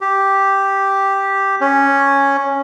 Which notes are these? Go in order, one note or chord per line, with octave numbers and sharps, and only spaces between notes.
G4
C#4